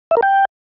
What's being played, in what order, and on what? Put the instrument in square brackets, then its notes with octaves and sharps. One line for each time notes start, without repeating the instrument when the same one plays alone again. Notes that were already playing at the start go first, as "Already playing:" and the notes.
[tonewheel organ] E5
A#4
G5